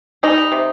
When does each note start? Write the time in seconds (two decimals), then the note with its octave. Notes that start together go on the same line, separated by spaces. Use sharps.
0.23 G3 D#4
0.38 G3
0.52 C3